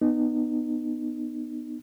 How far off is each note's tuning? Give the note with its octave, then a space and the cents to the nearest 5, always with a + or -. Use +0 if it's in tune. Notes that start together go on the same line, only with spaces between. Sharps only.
B3 +0 D#4 -30